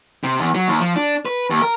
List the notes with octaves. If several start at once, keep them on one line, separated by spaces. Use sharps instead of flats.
C3
E2
F#3
D#2
F3
D4
B4
D#2
A#4